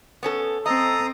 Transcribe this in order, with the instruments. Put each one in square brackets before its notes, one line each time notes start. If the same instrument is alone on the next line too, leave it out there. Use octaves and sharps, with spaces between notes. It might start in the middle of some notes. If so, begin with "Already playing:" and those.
[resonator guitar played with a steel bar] B3 C#4 A4
[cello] C4 [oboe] A4 [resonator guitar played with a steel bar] D#5 [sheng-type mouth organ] A#5 D#6